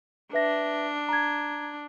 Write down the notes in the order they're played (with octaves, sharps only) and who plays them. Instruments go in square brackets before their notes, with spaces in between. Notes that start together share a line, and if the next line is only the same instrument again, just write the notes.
[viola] D4 [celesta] B4 E5 A#6
[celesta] A#5 G#6